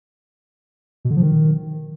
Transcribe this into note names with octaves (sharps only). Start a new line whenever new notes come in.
B2
D3
F3
D#3